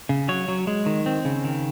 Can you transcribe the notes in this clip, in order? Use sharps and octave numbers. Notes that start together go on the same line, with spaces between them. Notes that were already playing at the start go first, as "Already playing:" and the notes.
C#3
F#3 C#5
F#3
G#3
D#3
C4
C#3
D#3